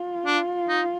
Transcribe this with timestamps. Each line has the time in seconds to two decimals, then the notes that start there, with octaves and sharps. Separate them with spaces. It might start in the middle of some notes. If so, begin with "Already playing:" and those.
Already playing: F4
0.26 D4
0.68 D#4